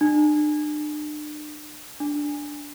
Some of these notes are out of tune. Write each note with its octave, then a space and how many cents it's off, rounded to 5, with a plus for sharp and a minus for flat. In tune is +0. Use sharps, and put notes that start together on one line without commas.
D4 +40
D4 +0